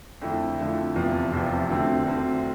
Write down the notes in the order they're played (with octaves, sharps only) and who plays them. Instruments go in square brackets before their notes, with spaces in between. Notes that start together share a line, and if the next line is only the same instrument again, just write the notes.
[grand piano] F2 D3 F3 A3 E4
F2 D3 F3 A3 E4
F1 E2 C3 F3
F1 E2 C3 F3
D2 D3 A3 C4
D2 D3 A3 C4